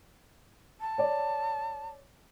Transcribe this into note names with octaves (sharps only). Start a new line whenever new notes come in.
A5
C#5 D5